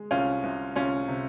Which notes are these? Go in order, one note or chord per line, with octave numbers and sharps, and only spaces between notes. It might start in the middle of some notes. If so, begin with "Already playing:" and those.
Already playing: G#3
C2 C#4 F4
C2
C2 C#4 F4
C3